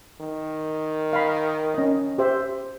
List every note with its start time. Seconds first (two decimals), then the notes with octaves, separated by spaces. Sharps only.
0.20 D#3
1.13 F5 B5
1.74 C#4 D#5
2.18 G4 C5 E5